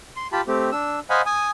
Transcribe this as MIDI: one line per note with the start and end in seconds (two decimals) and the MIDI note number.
0.16 0.28 84
0.32 0.41 65
0.32 0.41 67
0.32 0.41 81
0.32 0.41 83
0.47 0.70 57
0.47 0.70 60
0.47 0.70 67
0.72 0.99 62
0.72 0.99 88
1.10 1.22 72
1.10 1.22 75
1.10 1.22 77
1.10 1.22 78
1.10 1.22 80
1.10 1.22 83
1.26 1.51 80
1.26 1.51 87